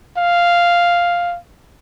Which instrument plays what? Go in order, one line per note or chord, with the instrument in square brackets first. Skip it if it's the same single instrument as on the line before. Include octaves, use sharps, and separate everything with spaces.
[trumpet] F5